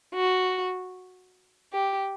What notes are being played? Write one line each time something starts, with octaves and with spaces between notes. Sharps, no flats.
F#4
G4